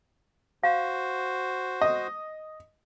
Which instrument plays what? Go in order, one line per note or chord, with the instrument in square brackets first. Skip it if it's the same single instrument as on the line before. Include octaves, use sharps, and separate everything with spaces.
[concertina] F#4 C5 [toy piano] F5
[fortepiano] D#5